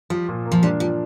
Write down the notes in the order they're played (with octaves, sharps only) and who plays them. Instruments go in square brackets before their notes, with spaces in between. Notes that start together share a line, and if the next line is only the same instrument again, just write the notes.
[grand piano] F3 [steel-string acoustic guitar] G3
[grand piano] A#2
A#3
[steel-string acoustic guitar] F3
[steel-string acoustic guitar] G3 [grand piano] D4
[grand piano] F3 [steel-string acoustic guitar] G3